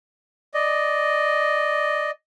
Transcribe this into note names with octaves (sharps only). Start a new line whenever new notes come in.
D5 D#5